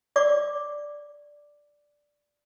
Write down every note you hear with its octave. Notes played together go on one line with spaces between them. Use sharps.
D5 D6